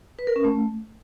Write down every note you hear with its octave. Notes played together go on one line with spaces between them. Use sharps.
B4
A#4
C#4
A3